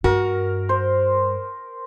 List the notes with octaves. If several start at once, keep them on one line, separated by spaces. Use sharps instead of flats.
G2 F#4 A#4
C5